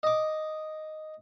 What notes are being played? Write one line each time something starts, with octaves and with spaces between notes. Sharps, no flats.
D#5 D6